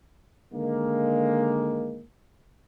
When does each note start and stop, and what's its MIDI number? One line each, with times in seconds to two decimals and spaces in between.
0.52 2.02 50
0.52 2.02 51
0.52 2.02 56
0.52 2.02 58